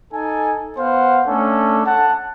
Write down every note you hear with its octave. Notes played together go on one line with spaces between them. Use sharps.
D#4 A4 G#5
B3 C5 F5 F#5
A3 C#4 D4 A4
F#5 A5